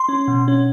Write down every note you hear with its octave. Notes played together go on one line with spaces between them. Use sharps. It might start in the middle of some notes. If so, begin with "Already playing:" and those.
Already playing: C6
C#4
B2
C#4